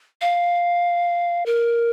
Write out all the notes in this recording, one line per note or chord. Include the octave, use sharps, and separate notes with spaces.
F5
A#4